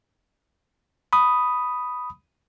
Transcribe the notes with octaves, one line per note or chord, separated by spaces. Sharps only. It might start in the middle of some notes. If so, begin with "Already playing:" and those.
B5 D#6